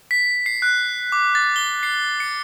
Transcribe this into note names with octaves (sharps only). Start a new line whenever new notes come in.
B6
C7
F#6
D6
A6
G7
C7
C#7